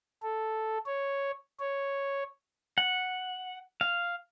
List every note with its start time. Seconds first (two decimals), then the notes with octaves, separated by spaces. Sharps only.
0.22 A4
0.86 C#5
1.60 C#5
2.78 F#5
3.81 F5